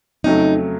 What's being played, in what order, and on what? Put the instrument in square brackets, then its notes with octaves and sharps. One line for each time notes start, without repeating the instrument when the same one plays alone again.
[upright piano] F2 C#3 F#3 A3 [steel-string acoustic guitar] D#4